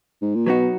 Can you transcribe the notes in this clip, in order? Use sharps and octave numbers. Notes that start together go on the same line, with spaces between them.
G#2
A#2
B2 F#3 B3 D#4 F#4